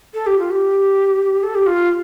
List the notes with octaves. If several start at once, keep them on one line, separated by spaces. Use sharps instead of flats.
A4
G4
F4
G4
A4
G4
F4